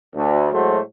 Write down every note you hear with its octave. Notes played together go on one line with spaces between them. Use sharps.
D2
A2 F#3 G#3 A3 F#4 C5